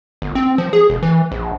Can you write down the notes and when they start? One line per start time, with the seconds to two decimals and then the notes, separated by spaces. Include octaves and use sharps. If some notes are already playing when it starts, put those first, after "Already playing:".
0.22 G1
0.35 C4
0.58 F3
0.73 G#4
0.90 E1
1.03 E3
1.32 A#1